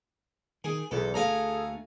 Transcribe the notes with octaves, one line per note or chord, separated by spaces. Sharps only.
D#3 G#4
B1 E2 A4
D2 A3 G#4 A4 F5 G#5 A#5